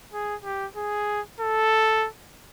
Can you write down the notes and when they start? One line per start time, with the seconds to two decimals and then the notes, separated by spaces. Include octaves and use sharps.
0.13 G#4
0.44 G4
0.76 G#4
1.40 A4